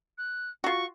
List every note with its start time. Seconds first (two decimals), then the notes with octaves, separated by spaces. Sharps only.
0.18 F#6
0.64 F4 F#4 C#6